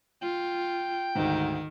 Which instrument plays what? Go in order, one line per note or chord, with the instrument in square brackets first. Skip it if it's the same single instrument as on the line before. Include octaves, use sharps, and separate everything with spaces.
[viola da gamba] F4 [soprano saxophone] G5
[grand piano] D2 G#2 [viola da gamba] D#3